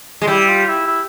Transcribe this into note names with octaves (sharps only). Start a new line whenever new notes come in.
G#3
G3 E4
F4
E4
E4